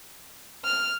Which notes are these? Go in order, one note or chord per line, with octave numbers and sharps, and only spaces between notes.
F6